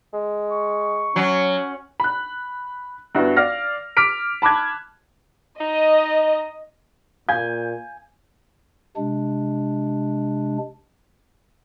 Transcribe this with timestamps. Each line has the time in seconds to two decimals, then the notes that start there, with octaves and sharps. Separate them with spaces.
0.14 G#3
0.51 C#6
1.16 F#3 C#4
2.00 B5 F#6
3.15 G2 B3 E4 F#4
3.36 D5 F5 F6 A#6
3.97 D6 F6 B6 D7
4.42 A5 B5 D6 F#6 G#6
5.61 D#4 D#5
7.29 A#2 F5 G#5 G6
8.96 C3 G#3 D4